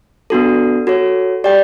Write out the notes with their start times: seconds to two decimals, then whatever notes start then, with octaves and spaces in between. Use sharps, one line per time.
0.30 B3 D4 F#4 A4
0.87 F#4 A4 C#5
1.44 G4 D5 G5